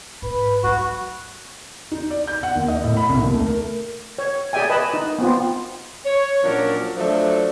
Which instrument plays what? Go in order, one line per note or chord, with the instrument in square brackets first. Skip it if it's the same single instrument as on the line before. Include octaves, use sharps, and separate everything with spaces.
[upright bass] G#2 [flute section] B4 B5
[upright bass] F#3 D#4 [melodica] F#4
[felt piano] D#4
D5
G6
F#5
D#2
D#5
A2
B5
C2
D#2
A3
A#4
[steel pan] C#5
G#4 D5 E5 G5 G#5
B4 D#5 E5 A5 B5
D#4
B3 C4 F4
[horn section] C#5
A#2 F3 F#3 C#4 D4 A#4
F3 F#3 A3 D4